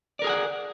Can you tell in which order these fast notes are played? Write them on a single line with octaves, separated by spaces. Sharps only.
D5 A#4 G#4 G#5 F#5